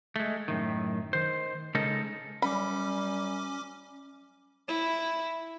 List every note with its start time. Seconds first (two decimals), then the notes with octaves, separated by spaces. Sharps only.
0.16 G#3 A3
0.48 F#2 A2 D#3
1.13 D#3 C5
1.75 C#3 G#3 D#4 A4 A#4
2.42 F#2 F#3 G3 C#4 B5 D6
4.68 E4